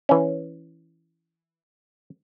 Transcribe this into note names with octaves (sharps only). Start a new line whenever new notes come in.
E3 C#4